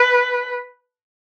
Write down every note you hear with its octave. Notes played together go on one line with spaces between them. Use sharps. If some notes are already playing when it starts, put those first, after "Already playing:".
Already playing: B4